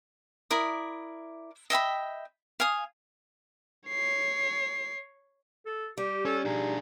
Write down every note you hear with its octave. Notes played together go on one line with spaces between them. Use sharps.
E4 A#4 D5 D#6
D#5 E5 G5 B5
F5 G#5 D#6
C#5 C7
A4
G3 G4
C#4 A4
D4 D#4 G#4